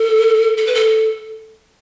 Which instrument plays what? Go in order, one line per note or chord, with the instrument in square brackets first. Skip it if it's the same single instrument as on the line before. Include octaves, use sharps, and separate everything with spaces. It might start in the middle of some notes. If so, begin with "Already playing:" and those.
Already playing: [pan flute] A4
A4
B4
A4